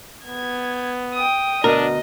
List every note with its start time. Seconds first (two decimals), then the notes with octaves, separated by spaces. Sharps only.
0.24 B3 G#6
1.15 G5 D#6
1.64 D2 B2 D4 A#4 D#5